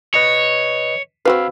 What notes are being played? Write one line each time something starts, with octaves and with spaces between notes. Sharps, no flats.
B4 C#5 D#5 C#7
C4 F#4 B4 F5 B5 E6